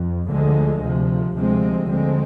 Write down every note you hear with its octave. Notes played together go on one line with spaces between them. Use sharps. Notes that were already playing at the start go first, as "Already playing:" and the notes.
Already playing: F2
D2 D3 F3 G#3
D2 C3 F3
D2 C3 F3 G#3 C4
D2 D3 G#3 C4